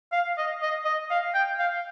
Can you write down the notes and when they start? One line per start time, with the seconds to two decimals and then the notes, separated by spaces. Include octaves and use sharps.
0.13 F5
0.38 D#5
0.62 D#5
0.85 D#5
1.11 F5
1.35 G5
1.59 F5